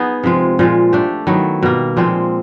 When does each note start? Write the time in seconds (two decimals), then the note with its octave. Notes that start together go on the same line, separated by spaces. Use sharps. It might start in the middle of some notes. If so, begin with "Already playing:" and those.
Already playing: B3 D#4 G#4
0.23 C3 F3 G#3
0.59 A#2 F3 G#3
0.93 A3 D4 G4
1.27 D#3 F#3 B3 E4
1.63 B2 G3 A#3
1.97 A#2 F3 G#3 C4